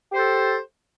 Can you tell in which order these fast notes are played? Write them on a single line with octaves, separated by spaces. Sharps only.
G4 C5 A4